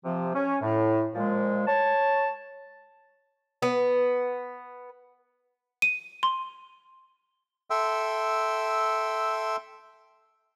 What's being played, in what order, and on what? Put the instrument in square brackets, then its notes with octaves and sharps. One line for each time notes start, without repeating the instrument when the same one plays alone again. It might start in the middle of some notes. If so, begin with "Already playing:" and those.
[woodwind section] C3 F3
C#4
A2
A#2 F3 G#3
C#5 A5
[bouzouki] B3
[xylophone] D#7
C6
[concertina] A4 E5 G5 C6 E6